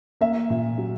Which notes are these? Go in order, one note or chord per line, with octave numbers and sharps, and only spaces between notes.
A#3 E5
A#2
F#3